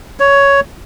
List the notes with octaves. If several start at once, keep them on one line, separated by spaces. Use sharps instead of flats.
C#5